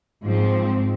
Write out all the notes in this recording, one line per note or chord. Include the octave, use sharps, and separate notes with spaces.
G#2 F3 C4